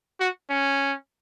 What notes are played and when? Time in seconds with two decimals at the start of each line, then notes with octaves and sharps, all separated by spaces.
0.20 F#4
0.50 C#4